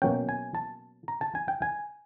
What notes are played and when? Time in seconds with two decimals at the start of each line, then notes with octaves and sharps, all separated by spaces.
0.02 B2 F#3 A#3 C#4 G5
0.29 G#5
0.55 A5
1.08 A#5
1.21 A5
1.35 G#5
1.48 G5
1.62 G#5